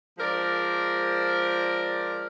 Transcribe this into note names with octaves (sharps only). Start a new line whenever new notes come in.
F3 G#3 A#4 C5 D5